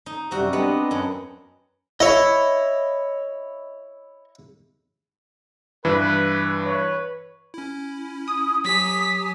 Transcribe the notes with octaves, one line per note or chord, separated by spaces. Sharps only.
D#4
F#2 C3 G3 C4 F#4
B3 C4 D4 D#5
F#2
E4 C#5 D#5
G2 E3 B4
B4 C#5
C#4 E4
D#6
F#3 G4 G#5 B6